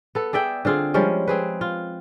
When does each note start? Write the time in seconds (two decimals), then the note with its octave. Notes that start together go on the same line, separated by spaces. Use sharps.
0.15 B3 A4
0.33 G#4 D5 E5 G5
0.65 D3 C4 F4 G#4
0.94 F3 G3 G#3 C#4
1.28 C4 G#4 B4
1.61 F4